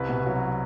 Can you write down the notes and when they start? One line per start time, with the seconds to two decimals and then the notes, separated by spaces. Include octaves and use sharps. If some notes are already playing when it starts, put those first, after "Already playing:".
Already playing: C2 B4
0.09 B2
0.26 F#3